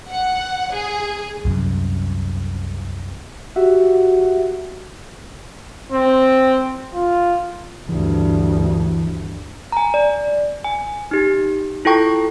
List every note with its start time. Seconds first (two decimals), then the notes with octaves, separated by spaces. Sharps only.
0.10 F#5
0.73 G#4
1.45 C2 F#2
3.56 F#4 G4 E5 F#5
5.92 C4
6.94 F4
7.89 D2 G2 E3
9.72 G#5 A#5
9.94 D5
10.64 G#5
11.11 D#4 G4
11.85 E4 F4 A4 G5 C#6